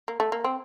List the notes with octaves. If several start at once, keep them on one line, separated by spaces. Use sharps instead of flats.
A#3
A3
A#3
C4